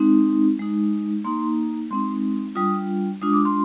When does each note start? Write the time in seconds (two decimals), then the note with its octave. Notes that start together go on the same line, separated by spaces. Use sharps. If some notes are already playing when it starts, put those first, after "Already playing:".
Already playing: G#3 C4 D#4
0.59 G#3 D#4
1.24 A#3 D#4 C6
1.91 G#3 C4 D#4 C6
2.55 G3 D4 F4 D#6
3.22 G#3 D4 F4 D#6
3.33 D6
3.45 C6